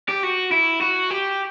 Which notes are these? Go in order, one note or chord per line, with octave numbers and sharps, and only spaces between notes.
G4
F#4
E4
F#4
G4